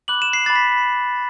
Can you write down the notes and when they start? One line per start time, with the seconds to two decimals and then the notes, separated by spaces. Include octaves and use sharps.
0.08 B5 D6 F#6 F#7
0.22 E7
0.33 C7
0.46 B5 D6 F#6 A6
0.55 B6